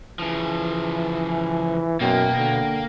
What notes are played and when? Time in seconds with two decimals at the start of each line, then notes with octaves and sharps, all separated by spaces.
0.19 C#3 E3 F3
2.01 F#2 B2 A#3 G5
2.38 D3